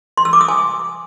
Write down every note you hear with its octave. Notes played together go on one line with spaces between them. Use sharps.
C6
E6
D6
D#6
G#5